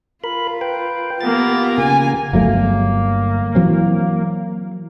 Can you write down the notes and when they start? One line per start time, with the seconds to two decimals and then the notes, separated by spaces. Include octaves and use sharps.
0.24 F4 A#4 B5
0.61 B4 G5
1.21 A#3 B3 F4 G4 A#4 A6
1.78 C#3 A#3 G#5
2.33 G1 F#3 A3 A#3
3.55 E3 F#3 C4